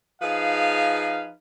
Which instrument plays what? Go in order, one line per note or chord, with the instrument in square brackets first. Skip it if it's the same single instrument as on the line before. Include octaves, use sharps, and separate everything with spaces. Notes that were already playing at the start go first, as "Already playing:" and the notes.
[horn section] F3 D#4 G#4 B4 F5